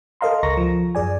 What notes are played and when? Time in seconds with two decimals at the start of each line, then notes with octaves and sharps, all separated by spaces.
0.21 A4 A#4 D#5 F5 A#5 C6
0.43 C#2 A#5 C#6 A#6
0.57 F3
0.95 F#2 G#4 D5 G#5